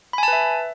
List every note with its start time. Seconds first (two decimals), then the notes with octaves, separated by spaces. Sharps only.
0.13 B5
0.18 G#5
0.23 A5
0.28 B4
0.33 E5